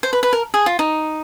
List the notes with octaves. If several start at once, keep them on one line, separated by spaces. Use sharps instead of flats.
C5
B4
B4
A#4
G#4
F4
D#4